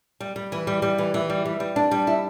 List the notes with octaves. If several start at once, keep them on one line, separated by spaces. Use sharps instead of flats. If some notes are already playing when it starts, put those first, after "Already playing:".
G3
G3
E3
G3
G3
E3
E3
G3
G3
G3
D4
G3
E4